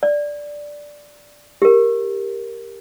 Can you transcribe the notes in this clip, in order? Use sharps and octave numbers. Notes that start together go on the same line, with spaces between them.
D5
G4 A#4